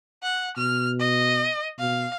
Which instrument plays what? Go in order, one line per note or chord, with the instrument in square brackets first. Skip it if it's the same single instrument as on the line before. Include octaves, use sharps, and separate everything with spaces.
[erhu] F#5
[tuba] B2 [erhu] F6
[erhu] D#5
[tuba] B2 [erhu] F5